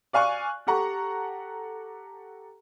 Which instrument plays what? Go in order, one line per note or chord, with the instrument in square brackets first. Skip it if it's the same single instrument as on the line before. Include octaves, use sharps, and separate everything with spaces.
[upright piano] D5 F5 G#5 C#6 F#6
G4 A4 F#5 A#5 C#6